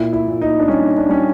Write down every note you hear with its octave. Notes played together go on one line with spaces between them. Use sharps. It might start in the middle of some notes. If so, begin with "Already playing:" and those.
Already playing: A#2 E4
E4
A#2
D#4
D4
G3 C#4
D4
G3 C#4